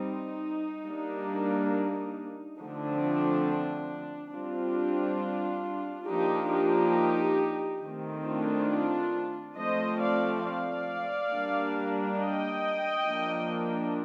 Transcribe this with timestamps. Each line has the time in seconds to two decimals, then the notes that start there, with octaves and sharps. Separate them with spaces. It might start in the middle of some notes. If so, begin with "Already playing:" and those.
Already playing: G3 C4 D#4
0.86 G3 A#3 D4
2.61 D3 F3 A3 C4 D4
4.35 G3 C4 D4 F4
6.09 F3 A#3 D4 D#4 G4
6.52 D#4 G4
7.83 D#3 A3 C4
8.26 D4 F4
9.57 F3 A3 C4 C5 D#5
10.00 D5 F5
10.44 D5 F5
11.31 G3 A#3 D4
12.18 D#5 G5
13.06 F3 A#3 D4